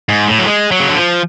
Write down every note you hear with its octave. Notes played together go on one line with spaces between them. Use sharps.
G#2
A2
F#3
G#3
F#3
C#3
D3
F3